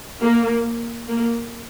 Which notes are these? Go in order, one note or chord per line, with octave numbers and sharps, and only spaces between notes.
A#3
A#3